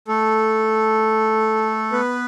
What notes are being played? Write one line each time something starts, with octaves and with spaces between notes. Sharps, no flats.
A3 A4
B3 B4